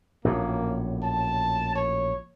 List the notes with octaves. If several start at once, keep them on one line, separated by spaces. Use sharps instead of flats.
A#1 F#2 A2 A#3
A5
C#5